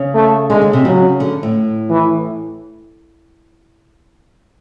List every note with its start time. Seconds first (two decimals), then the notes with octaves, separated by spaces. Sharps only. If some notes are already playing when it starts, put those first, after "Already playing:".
Already playing: C#3
0.15 A3
0.50 D3 G#3
0.62 C#3
0.73 C3
0.85 C#3 F#3
1.20 D3
1.43 A2
1.90 E3